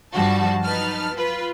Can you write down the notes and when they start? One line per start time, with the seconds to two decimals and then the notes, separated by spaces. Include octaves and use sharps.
0.14 G2 F3 G3 F#4 A5
0.64 F#3 D#4 B4 A5 F6
1.15 F4 B4